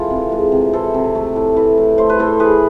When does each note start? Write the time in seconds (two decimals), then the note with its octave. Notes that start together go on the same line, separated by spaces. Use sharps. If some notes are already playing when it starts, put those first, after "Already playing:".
Already playing: E3 G#3 F4 A4
0.10 C3
0.32 G#3
0.52 C3
0.73 E3 A4 C5
0.94 C3
1.15 A3
1.36 A2
1.56 E3
1.77 A2
1.98 A3 C5
2.10 B4
2.19 A2 A4 C5
2.40 E3 G#4 B4